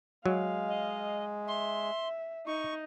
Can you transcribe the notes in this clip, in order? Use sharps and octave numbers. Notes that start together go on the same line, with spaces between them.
F#3 G#3 F5
D#5
E5 C6
D#4 C#6